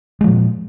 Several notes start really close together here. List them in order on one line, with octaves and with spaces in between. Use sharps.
G#3 F3 A#2